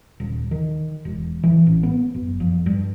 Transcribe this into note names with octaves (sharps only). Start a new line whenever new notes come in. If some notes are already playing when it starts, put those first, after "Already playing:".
D#1
D#3
E1
E3
A1
B3
F#1
F2
G2